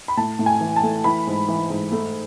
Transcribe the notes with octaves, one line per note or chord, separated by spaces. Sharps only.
B5
A2 A5
A2
G#5
E3
A5
A3
E3 B5
G#2
E3
G#2
A3